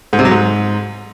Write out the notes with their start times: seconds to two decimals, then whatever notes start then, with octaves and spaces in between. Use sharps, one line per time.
0.13 G#2
0.19 C3
0.25 F#3
0.31 G#2